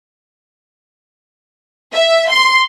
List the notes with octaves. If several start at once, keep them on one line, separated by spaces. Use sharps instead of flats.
E5
C6